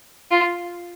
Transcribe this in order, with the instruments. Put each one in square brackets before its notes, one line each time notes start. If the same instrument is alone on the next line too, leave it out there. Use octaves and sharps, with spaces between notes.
[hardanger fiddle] F4